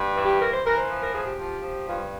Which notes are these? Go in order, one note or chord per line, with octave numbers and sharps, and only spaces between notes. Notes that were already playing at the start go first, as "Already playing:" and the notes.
Already playing: G2
E3
G4
E3 A#4
C5
E3 A#4
C5
F3
A#4
F3 G#4
G4
F3
F3
G2 F4